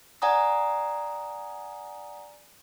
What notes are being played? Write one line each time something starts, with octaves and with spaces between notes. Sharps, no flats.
D5 F#5 G#5 A#5 D#6